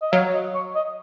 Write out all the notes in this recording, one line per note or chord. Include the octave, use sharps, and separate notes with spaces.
D#5
F#3 F5
D#5
C#5
D#5